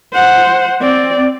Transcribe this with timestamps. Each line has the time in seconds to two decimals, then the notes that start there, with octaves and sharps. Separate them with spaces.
0.13 C5 F#5
0.80 C4 D5